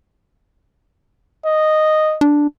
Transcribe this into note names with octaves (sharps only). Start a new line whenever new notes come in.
D#5
D4